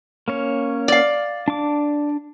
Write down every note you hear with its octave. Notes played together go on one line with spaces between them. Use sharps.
A#3 C#4 C#5
D5 F5
D4 D6